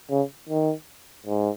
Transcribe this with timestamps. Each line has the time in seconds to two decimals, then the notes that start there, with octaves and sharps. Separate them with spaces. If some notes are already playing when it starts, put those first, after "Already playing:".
0.11 C#3
0.49 D#3
1.27 G#2